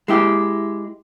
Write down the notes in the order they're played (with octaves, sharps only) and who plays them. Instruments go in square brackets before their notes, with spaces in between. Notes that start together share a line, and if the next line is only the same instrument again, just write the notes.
[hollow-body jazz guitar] G#3 E4 G4